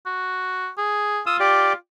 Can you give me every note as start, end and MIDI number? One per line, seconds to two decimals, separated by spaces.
0.06 0.69 66
0.78 1.21 68
1.26 1.75 65
1.26 1.37 87
1.26 1.37 88
1.40 1.73 67
1.40 1.73 74